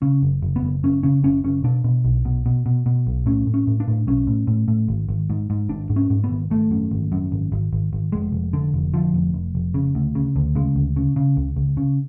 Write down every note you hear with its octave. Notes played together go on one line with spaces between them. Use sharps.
C#3 C#4
F#1
F#1
B3
F#1
F#1 C#4
C#3 C#4
F#1 C#4
F#1 C#4
B2 D4
B2
B1
B2
B2
B2
B2
B1
A2 C#4
A2
C#4
A2
D4
A2
B1 C#4
A2
A2
A2
G#1
G#1
G#2
G#2
G#1 D4
G#2
C#4
G#2
B3
G#1
G#1 A3
F#2
G#1
F#2
G#1
G#1
G#1
G#1
F1 G#3
F1
D3
F1
D3 F3
F1
F1
F1
C#3
D2
C#3
D2
C#3 G#3
D2
C#3
C#3
C#2
C#2
C#3